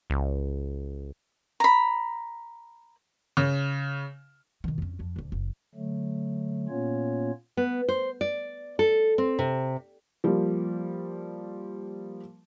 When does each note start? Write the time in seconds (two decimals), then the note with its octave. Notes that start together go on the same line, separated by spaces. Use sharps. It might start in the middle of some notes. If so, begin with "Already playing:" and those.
0.10 C#2
1.60 A#5 B5
3.37 C#3
4.64 B2 D#3
4.78 F2 C#4
4.99 F2 D4
5.16 D#1 D2
5.32 F#1
5.75 D3 F#3 A3
6.69 A#2 A#3 B3 C#4 F4 C#5
7.57 B3
7.88 C5
8.21 D5
8.79 A4
9.18 C4
9.39 C3
10.24 F3 G3 A#3